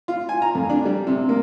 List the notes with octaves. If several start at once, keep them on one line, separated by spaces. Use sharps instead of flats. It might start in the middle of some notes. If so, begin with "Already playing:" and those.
F4
G#5
A#5
F2
D4
G3
C3
A#3